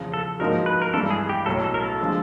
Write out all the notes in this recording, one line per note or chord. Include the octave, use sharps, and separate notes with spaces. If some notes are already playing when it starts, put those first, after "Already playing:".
Already playing: E2 C#3 F3
A4
G#2 F3 A#3 D#4 F#4 A#4
B4
A#4
G2 E3 G#3 A4
G#4
G4
B1 A2 F#3 A4
A4
A#4
A4
D3 F3 G#3